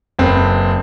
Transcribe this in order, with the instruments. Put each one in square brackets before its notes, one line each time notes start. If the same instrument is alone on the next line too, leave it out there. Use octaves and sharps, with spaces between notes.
[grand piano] F#1 C4 B4